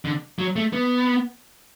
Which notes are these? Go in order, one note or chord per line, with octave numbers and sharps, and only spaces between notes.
D3
F#3
A3
B3